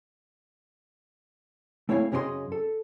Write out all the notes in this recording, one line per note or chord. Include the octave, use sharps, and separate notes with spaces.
A3 C4 E4 C#5 F5 G#5
F#2 C#3 C#4 G4 D#5 C6
A4